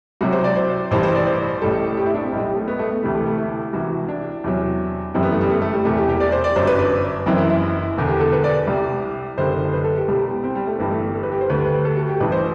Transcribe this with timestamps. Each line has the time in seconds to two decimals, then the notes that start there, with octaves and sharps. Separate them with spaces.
0.21 C2 C3 F#3 F#4
0.32 C5
0.44 D5
0.56 C5
0.91 A1 G2 E3 G3 C5
1.03 C5
1.15 D5
1.27 C5
1.62 A1 A2 G3 A4
1.97 G4
2.06 E4
2.14 D4
2.24 C4
2.32 B1 A2 G3
2.44 G3
2.56 A3
2.68 B3
2.79 A3
2.91 A3
3.03 D2 C3 E3 G3
3.14 A3
3.26 A3
3.38 E4
3.73 C2 C3 E3 F#4
4.08 D4
4.44 E2 C3 F#3
5.14 G1 F#2 E3 G3 C4
5.23 B3
5.32 A3
5.41 G3
5.50 A3
5.62 A3
5.73 G3
5.85 E1 E2 C3 A3
5.97 G4
6.09 G4
6.20 D5
6.32 C5
6.44 D5
6.56 G1 F#2 F#3 C5
6.67 B4
6.79 D4
7.26 F#1 F#2 E3 C4
7.38 E4
7.50 E4
7.97 E1 E2 D3
8.08 G4
8.20 A4
8.32 B4
8.44 D5
8.67 C2 C3 G3
9.37 F#1 F#2 D3 G3 C5
9.73 B4
9.84 A4
9.96 G4
10.08 C2 B2 G3 G4
10.44 C4
10.55 G3
10.67 A3
10.79 G1 G2 E3 G3 B3
10.91 A3
11.15 A4
11.23 B4
11.32 G4
11.41 C5
11.49 D2 D3 G3 B4
11.85 A4
11.97 F#4
12.09 G4
12.20 A1 G2 E3 B4
12.32 C5